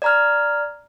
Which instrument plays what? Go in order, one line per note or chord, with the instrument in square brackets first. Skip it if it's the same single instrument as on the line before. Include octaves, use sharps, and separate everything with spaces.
[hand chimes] D5 A#5 F6